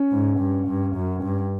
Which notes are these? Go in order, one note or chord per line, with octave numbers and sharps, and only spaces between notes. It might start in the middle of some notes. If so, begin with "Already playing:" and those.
Already playing: C#4
G#2
G2
G2
F#2
G2